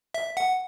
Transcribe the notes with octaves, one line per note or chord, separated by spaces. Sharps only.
E5
F#5